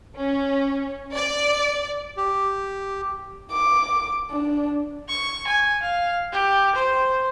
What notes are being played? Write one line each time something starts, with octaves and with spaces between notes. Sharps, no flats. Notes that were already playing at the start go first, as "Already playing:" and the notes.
C#4
D5
G4
D6
D4
C#6
G#5
F5
G4
C5